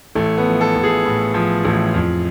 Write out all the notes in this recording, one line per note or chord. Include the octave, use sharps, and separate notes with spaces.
A1 A3
B3
F3
A4
A1
G#4
A2
F3
A1
F2